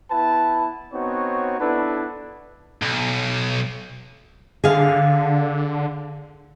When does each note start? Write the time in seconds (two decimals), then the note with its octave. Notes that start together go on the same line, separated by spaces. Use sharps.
0.11 B3 E4 B4 A5
0.93 B3 C4 D#4 F#4 C#5
1.60 B3 D4 E4 A4 B4
2.82 B1
4.64 D3 G#4 F5